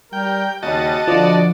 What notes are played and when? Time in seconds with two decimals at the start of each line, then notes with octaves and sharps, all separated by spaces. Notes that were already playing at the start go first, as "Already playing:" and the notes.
0.13 G3 A#4 G5
0.63 D#2 C#3 G3 F#4 D#5 A5
1.08 D3 F3 D5